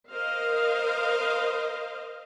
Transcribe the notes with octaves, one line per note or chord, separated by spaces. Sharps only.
A#4 C5 D#5 F5